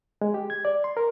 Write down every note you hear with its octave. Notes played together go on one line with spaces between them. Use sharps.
G#3
G4
G#6
D5
C6
A#4